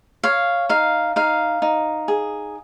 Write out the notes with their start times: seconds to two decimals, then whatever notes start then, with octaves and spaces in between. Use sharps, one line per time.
0.24 C#5 F5
0.69 D#4 F5
1.16 D#4 F5
1.62 D#4
2.08 G#4